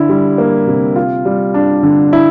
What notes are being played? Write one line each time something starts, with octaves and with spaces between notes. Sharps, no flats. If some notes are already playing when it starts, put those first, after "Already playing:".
Already playing: D3 E4
G3
A#3
C3
F4
G3
D4
D3
E4